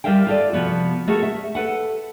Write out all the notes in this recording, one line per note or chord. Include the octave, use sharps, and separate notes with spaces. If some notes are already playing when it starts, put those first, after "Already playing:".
G3 F4 A#4 E5 F5 G5
F4 A4 D5
C3 F3 B3 F#4
A3 C#4 F#4 G#4 A#4
E5
A4 B4 F#5